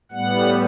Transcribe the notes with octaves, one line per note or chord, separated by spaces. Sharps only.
A2 G3 B3 F#5